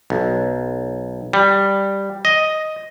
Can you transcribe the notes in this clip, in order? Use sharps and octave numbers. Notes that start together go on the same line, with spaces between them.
B1
G3
D#5